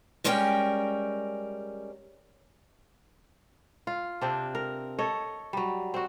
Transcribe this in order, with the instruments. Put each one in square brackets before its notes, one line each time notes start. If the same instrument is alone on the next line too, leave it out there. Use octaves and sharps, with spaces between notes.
[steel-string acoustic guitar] G3 G#3 C#4 A#4 G5
[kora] F4
C3 C4 D4
A#4
A4 C#5 D#5
F#3 G3
C4 F#4